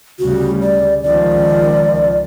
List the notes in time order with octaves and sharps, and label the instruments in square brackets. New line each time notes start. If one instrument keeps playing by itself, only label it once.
[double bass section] D2 C#3 G3 [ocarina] F#4
[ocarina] D5
[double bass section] C#2 D#3 F3 [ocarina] D5